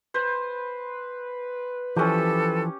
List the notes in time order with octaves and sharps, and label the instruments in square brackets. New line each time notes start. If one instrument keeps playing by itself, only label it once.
[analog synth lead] B4 [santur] C5
[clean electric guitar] E3 F3 [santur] C#4 G4 [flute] A4